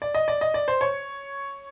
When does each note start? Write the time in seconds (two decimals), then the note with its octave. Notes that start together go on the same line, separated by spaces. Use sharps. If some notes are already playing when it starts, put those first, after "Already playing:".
0.02 D5
0.15 D#5
0.28 D5
0.41 D#5
0.54 D5
0.68 C5
0.81 C#5